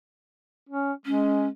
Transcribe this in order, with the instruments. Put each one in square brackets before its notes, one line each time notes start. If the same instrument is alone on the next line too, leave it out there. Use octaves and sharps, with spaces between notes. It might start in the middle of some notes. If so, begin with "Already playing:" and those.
[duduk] C#4
[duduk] G#3 [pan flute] C#4